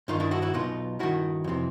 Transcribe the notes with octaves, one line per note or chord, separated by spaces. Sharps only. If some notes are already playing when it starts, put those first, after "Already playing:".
G2 D#3 D#4 F4
D4 E4
E4 F#4
E4 F#4
B1 B2 D#4 F4
G2 D#3 E4 F#4
F2 C3 E3